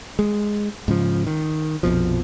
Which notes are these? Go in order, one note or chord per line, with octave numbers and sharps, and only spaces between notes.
G#3
G#2 C#3 F3
D#3
A#1 F2 B2 F3